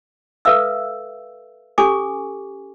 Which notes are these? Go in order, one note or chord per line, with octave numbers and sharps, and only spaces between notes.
A4 B4 E5 F5 E6
C#4 G4 A4 G#5 C#6 D6